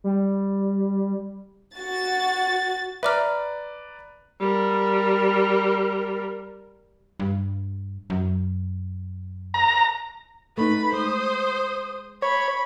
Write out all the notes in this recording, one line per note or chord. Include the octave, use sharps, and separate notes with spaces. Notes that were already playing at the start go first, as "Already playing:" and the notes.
G3
F#4 A6
B4 D5 E5 A#5 D6 F6
G3 A#4
G2
F#2
A#5
A3 D#4 B4 B5
G#3 C5 D#6
C#5 B5